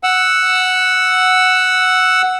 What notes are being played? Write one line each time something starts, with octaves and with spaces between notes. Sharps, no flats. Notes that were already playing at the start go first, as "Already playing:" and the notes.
F#5 E6